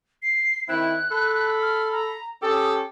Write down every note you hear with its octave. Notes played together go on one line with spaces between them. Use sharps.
C7
D#3 C4 E4 F#6
A4 B5
F6
A#5
C#4 G4 A4 D#6